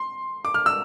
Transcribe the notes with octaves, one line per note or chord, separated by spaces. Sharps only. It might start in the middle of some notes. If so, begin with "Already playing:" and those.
Already playing: C6
D6
F6
E6